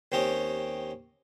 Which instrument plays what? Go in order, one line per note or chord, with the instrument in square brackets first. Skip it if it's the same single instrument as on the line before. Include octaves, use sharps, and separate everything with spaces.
[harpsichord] D#2 C4 C#4 G4 D#5